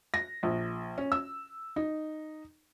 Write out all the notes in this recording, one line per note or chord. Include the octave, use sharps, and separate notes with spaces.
A#6
A#1
C#4
E6
D#4